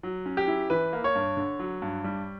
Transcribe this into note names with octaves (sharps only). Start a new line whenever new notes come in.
F#3
C#4
G4
E4
E3 B4
A#3
C#5
G2
D3
F#3
G2
G3